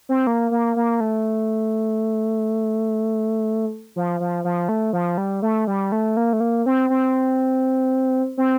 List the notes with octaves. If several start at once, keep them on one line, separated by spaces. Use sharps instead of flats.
C4
A#3
A#3
A#3
A3
F3
F3
F3
A3
F3
G3
A3
G3
A3
A#3
A3
A#3
C4
C4
C4